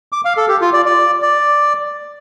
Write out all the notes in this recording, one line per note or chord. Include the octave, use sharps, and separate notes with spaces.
D6
F5
A4
G4
F4
D5
D5
D5